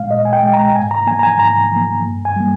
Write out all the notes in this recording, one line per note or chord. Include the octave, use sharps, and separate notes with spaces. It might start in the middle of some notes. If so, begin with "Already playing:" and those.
Already playing: A#2 G#3 F5
A#2 D#5
G#5
G5
G#3
A#5
G#2 G#5
A#5
F3 A#3 G#5
A#5
G#5
G#2 A#5
F3 A#3
G2
G#5
G3 A#3